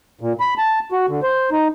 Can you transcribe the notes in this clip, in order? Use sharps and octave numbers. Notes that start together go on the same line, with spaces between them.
A#2
B5
A5
F#4
D3
C5
D#4